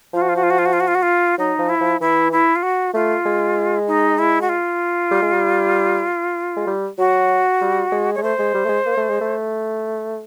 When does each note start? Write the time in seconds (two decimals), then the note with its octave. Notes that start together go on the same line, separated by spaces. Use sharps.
0.14 F3 F4
0.21 F#4
0.29 F4
0.36 F#4
0.43 F4
0.50 F#4
0.58 F4
0.65 F#4
0.73 F4
0.80 F#4
0.87 F4
0.95 F#4
1.02 F4
1.38 F#3 D#4
1.59 F3
1.69 E4
1.81 F3
2.01 E3 E4
2.32 E4
2.55 F4
2.63 F#4
2.94 A3 F4
3.26 G#3
3.87 D#4
4.18 E4
4.41 F#4
4.49 F4
5.11 G3
5.22 G#3
5.33 G3
6.57 G#3
6.67 G3
6.98 F#3 F#4
7.61 G3
7.92 G#3
8.15 C#5
8.18 G#3
8.22 A3 C5
8.39 G#3
8.54 G3
8.65 A3
8.69 G#3
8.86 A#3
8.97 A3
9.09 G#3
9.21 A3